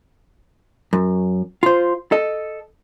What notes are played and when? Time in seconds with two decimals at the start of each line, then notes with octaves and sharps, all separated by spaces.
0.93 F#2
1.63 F4 C5
2.12 A4 D#5